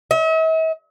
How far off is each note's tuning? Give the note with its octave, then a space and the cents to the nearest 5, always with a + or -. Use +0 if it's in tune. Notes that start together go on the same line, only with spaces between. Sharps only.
E5 -45